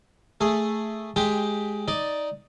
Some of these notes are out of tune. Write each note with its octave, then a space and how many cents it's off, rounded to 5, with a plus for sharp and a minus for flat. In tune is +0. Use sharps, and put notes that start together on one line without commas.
A3 +0 G#4 +0
G#3 +10 G4 +15 G5 +0
D#4 +0 D5 +0